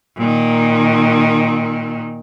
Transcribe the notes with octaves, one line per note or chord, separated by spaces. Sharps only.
A#2 D#3